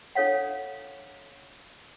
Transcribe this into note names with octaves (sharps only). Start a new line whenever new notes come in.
D4 A4 C#5 F5 F#5